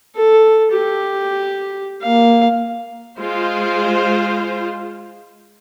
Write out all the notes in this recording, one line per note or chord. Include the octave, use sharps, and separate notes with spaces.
A4
G4
A#3 F5
G#3 F4 C5